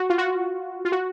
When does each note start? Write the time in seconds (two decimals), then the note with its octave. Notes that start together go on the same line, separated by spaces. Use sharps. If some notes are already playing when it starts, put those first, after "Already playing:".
Already playing: F#4
0.10 F4
0.18 F#4
0.85 F4
0.92 F#4